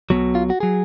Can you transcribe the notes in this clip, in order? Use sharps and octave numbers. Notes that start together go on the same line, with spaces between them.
B1 B2 F#3
F4
F#4
F#3 G#4